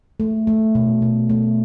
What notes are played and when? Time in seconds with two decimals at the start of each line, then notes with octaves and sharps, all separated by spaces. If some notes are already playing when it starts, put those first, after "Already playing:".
0.20 A3
0.47 A3
0.75 B2
1.02 B2
1.29 A3